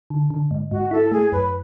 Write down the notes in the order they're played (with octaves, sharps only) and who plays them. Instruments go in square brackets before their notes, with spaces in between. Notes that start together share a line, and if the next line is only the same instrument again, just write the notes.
[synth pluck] D3
D3
G#2
[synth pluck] G#2 [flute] F#4
[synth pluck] E4 [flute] A4
[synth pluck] A3 [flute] G#4
[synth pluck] F#2 [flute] B4